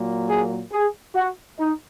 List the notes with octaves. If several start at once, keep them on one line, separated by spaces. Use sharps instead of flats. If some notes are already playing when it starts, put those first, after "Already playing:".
Already playing: A#2 F#3 A#3
G#4
G#4
F#4
D#4